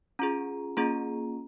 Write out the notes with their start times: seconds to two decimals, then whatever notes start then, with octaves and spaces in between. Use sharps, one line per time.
0.19 C#4 F4 G#4 A#5
0.77 A#3 C#4 F4 G#4 A#5